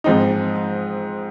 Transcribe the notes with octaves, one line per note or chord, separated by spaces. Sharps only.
G#2 F3 C4 D#4